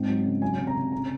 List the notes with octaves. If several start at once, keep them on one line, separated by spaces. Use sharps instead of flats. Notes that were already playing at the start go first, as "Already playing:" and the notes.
Already playing: G#2 C4
F#3
C#3
F#3 G#5
C3
A#5
C3
C#3 A#5